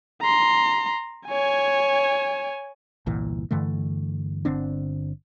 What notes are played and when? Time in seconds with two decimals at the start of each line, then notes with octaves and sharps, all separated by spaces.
0.22 A#5 C6
1.28 C#5 G#5
3.06 G1 C2 A#2 E3
3.51 G2 D3 E3 A3
4.45 G1 D3 C4 D4